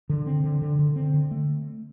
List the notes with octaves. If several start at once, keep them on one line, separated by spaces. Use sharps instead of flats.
D3
C4
D3
D3
D3
C4
D3
A3